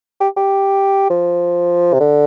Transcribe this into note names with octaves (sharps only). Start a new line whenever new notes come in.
G4
G4
F3
C3
D3